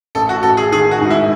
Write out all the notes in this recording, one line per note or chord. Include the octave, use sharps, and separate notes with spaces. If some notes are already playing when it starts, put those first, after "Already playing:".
A1 A4
F#4
A1 A4
G#4
D#3 G#4
F#4
G#2
E4